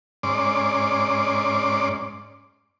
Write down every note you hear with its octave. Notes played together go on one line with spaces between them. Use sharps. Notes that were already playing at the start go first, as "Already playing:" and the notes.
G#2 C#4 D5 C6 D6